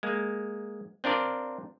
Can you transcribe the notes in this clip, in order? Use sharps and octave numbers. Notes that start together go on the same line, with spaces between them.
G#3 A#3
C4 D4 F4 A#4 D5